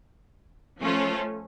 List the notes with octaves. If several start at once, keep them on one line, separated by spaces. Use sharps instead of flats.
F3 A3 C#4 F4 A4